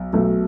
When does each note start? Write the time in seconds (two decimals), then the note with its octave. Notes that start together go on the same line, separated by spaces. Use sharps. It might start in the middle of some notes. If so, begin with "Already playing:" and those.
Already playing: B1
0.13 B1 B2 A3